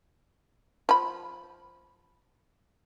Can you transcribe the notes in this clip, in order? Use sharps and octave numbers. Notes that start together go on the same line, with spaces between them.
F3 B5